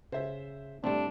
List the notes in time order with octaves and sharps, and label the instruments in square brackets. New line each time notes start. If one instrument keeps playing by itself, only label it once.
[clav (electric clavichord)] C#3 [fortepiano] C5 E5
[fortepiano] A2 [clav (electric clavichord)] G3 A3 C4 [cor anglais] D4